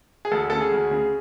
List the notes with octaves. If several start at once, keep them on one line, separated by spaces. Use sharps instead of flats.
G#4
D2 A4
C#3 A4
G#4
D2
C#3